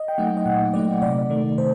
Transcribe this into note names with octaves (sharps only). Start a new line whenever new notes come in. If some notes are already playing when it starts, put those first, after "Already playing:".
Already playing: D#5
G5
F#3 A3 D#4 F#5
G5
D#5
A#2 F#5
F#3 A3 D#4 D5
C3 D5
D#3 A3
C3 C5